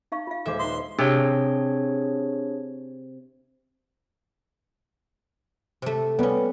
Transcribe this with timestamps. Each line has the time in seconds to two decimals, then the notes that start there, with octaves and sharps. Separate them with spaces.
0.12 D#4 F5 C#6
0.27 F4 F5
0.46 D#1 G#3 A4 C5 E5 F5 D6
0.60 D#4 B4 D#5 C6 D#6
0.99 C3 D4 G#4 C#5
5.82 C3 A3
6.19 G3 B3 C#4